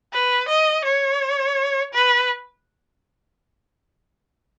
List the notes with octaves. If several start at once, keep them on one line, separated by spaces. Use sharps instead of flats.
B4
D#5
C#5
B4